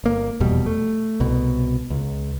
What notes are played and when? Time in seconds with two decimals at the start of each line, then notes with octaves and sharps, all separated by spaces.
0.04 G1 A#3
0.40 F1 E2 B2 G3
0.66 A3
1.20 C2 B2
1.90 C#2